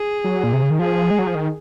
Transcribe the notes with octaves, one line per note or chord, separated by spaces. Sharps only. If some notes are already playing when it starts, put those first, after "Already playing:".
Already playing: G#4
F#3
A#2
C3
C#3
D#3
F3 G#4
G#3
F#3
F3
D#3